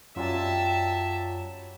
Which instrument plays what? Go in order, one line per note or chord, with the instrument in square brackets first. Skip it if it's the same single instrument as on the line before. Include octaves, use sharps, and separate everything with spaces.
[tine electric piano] F#2 F4 [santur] F#3 G3 G#5 [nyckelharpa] E5 A5